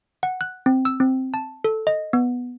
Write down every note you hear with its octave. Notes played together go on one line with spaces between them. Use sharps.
F#5
F#6
C4
E6
C4
A5
A4
D#5
B3